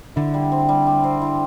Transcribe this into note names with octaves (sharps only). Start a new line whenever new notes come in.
D3 E4
G3
C4
G3
G3
C4
E4